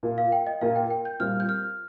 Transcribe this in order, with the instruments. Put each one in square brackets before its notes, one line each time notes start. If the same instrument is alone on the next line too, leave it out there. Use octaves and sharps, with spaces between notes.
[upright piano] A#2 A#3 F4
[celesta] F5
G5
D#5
[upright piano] A#2 A#3 F4 [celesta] F5
[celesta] G5
G5
G6
[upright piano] A#2 G3 C4 F4 [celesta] F6
[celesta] G6
F6